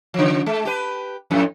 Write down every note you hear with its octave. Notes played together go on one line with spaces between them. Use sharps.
C#3 F3
G#3
G4 B4
F2 A2